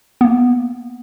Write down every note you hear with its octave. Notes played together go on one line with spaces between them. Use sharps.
A#3 B3